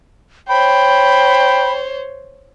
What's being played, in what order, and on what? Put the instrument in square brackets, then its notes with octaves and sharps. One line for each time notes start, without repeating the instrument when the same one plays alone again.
[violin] C5 C#5 [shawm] G5 [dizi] B5